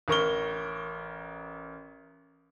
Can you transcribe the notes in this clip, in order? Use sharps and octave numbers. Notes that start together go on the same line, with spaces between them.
A1 A#4 C#6 G7